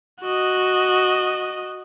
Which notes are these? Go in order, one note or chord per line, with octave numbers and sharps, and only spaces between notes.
F#4 D#5